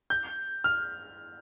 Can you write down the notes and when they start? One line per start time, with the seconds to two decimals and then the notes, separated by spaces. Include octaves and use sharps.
0.10 G6
0.64 F6